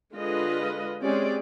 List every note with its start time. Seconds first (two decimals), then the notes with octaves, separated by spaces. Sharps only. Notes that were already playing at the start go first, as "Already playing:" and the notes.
0.14 D3 G#3 F4 B4 D#5
1.03 G#3 C4 C#4 G4 G#4 D5